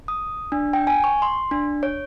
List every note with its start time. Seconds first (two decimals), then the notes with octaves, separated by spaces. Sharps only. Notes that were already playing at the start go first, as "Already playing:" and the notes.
0.08 D#6
0.52 D4
0.73 G5
0.87 G#5
1.04 C#6
1.22 C6
1.51 D4
1.83 C#5